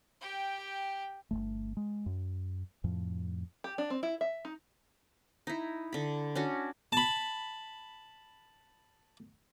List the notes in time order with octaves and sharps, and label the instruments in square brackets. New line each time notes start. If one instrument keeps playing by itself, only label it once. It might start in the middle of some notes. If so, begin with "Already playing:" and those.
[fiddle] G4 G5
[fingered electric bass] G1 E2 A3
G#3
F#2
F2 A2 F3
[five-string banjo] G4
D4
C4
E4
E5
D#4
[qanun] D#4 E4
D3 B5
C#4 D4 F#4
[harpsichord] A5 B5